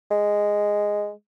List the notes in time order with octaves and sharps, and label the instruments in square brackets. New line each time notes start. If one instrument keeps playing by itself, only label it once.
[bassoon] G#3